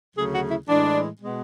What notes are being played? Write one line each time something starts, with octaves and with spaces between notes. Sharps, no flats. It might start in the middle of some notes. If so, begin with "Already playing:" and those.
D2 C#3 F#3 A3 G#4
F#4
E4
A2 E3 G#3 D4
B2 G#3 B3